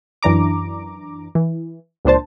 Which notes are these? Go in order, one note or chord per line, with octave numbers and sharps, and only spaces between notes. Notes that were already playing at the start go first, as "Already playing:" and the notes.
F#2 E3 D4 A#5 D6
E3
C#2 A#2 D4 C5 A5